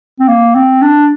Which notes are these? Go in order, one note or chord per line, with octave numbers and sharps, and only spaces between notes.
C4
A#3
C4
D4